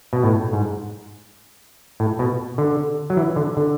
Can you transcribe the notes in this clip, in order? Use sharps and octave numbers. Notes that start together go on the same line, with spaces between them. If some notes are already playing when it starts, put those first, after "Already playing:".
B2
A2
G#2
A2
B2
D3
F#3
E3
D3
D3